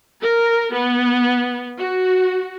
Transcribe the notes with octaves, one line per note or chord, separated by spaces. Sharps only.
A#4
B3
F#4